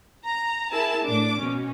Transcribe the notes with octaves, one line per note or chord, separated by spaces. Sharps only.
A#5
E4 G#4 A#4 A5 B5
A2 D4 D6
B2 C#4